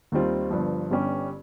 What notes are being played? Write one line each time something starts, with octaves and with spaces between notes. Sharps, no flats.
D#2 D#3 G3 C4 F4
G1 G2 F3
G1 G2 G3 C#4 G4